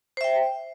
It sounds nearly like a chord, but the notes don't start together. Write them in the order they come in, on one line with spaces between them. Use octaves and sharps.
C5 E5 G5